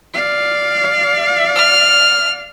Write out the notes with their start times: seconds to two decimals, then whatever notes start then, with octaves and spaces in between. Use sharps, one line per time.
0.14 D5 F5
1.56 F6